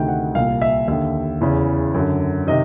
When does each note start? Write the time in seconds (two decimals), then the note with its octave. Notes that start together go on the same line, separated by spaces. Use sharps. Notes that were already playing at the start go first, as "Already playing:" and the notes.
Already playing: D2 C3 D#3 G5
0.08 F#5
0.35 C2 A#2 F5
0.62 E5
0.88 D#2 D3 E5
1.41 E2 C#3 E3
1.94 F#2 D3
2.47 C3 D#3 D#5